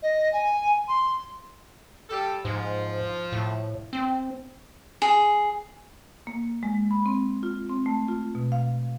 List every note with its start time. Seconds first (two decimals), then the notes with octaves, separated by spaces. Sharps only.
0.03 D#5
0.33 G#5
0.88 C6
2.10 G3 G4 A4
2.45 G#2 F3
3.32 A2
3.93 C4
5.02 G#4
6.27 A#3
6.63 G#3
6.91 B5
7.06 C4
7.43 F4
7.69 C4
7.86 A3
8.08 F4
8.35 B2
8.52 F5